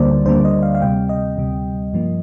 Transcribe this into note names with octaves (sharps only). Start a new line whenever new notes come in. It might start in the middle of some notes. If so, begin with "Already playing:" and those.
Already playing: D2 D3 G3 A#3 C5 D5
D2 D3 G3 A#3 C5
D#5
F5
F5
D2 C3 G3 G5
D#5
D2 C3 G3
G2 F3 A#3